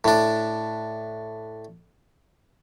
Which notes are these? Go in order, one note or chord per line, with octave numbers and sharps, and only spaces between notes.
A2 D4